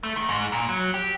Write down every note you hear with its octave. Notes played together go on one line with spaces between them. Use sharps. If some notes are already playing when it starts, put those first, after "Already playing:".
A3
D#3
G#2
A#2
F#3
G4